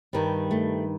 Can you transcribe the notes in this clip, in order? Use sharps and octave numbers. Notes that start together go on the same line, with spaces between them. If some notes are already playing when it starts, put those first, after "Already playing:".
G2 D#3 G3
A3